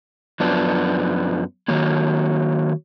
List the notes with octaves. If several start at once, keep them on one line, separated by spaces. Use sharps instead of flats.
F#2 F3 B3 D4
D#3 F#3 A#3